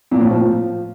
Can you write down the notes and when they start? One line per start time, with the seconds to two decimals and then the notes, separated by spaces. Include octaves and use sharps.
0.11 A#2
0.21 A2
0.31 F3